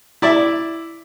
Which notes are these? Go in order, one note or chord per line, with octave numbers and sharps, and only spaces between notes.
E4 D5 E5